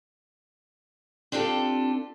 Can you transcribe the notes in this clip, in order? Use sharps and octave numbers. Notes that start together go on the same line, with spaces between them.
C4 D4 F4 G4 A4